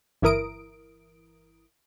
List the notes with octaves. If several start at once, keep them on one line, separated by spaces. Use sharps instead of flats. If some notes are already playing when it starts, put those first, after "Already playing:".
G1 E3 E4 A#4 D#6 D7